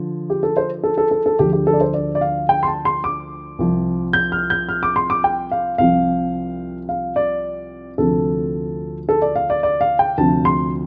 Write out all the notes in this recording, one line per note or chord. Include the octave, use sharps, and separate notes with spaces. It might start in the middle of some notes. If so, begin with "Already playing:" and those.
Already playing: D3 F3
G4
A4
C5
A4
A4
A4
A4
D2 D3 F3 G4
G4
A4
D5
C5
D5
D5
F5
G5
C6
A5
C6
D6
C2 C3 F3
G6
F6
G6
F6
D6
C6
D6
G5
F5
C2 C3 F3 F5
F5
D5
D2 C3 F3 A4
A4
D5
F5
D5
D5
F5
G5
D2 C3 F3 A5
C6